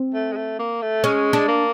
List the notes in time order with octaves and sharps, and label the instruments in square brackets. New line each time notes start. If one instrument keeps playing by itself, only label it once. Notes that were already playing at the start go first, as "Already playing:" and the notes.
Already playing: [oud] C4
[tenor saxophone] A3
G#3
A3
A#3
A3
[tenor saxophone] G#3 [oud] C#4
[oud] D4
[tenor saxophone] A#3